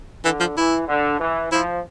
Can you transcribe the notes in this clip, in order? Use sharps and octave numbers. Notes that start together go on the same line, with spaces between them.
D3 E3
F3
E3 E4
D3
E3
F3 E4